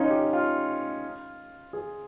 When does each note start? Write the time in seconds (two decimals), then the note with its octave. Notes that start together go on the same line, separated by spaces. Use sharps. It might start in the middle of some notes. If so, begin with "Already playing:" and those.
Already playing: C#4 D#4 F4
0.11 G4
0.33 F4
1.73 G#4